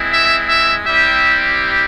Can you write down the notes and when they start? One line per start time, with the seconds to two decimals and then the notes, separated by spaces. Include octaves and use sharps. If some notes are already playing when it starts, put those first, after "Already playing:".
Already playing: G#3 C4 E4
0.12 E5
0.48 E5
0.86 G3 C4 E4 G4 E5